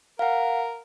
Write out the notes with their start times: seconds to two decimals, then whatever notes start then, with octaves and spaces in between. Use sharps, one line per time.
0.19 A#4 F5 F#5